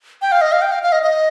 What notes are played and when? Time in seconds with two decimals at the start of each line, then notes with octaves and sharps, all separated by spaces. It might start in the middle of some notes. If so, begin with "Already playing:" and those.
0.22 G5
0.32 F5
0.41 D#5
0.52 F5
0.62 G5
0.72 F5
0.83 F5
0.92 D#5
1.03 D#5